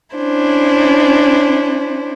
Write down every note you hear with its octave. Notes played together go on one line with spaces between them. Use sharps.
C#4 D4 E4 C5